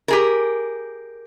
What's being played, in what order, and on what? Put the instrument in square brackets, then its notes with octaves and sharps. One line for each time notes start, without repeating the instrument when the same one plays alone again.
[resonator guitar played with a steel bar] G4 G#4 A#4